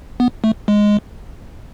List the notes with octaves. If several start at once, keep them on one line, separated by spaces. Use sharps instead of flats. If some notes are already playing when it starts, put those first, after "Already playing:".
B3
A3
G#3